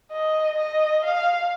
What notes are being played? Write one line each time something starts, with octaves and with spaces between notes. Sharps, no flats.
D#5
D#5
F5